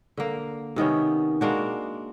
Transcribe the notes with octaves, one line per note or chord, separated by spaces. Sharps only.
D3 A#3
C3 D#3 B3 C#4
G#3 A#3 D4 F#4